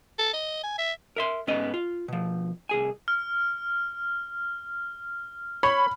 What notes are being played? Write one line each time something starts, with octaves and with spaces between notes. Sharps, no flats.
A4
D#5
G#5
E5
A#4 E5 C6
G#2 B3 C#4 D#5
F4
B2 F3
C2 G#4 G#5
F6
C#5 B5